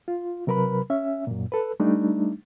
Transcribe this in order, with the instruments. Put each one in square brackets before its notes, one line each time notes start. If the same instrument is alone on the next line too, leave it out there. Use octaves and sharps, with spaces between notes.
[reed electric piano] F4
C3 F#3 A#4 B4 B5
C#4 E5
F#2 A#2
A4 B4
G3 A3 D4 D#4